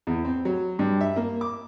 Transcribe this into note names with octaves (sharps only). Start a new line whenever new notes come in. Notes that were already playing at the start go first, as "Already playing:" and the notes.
E2
C4
F#3
G2
E5
A#3
D6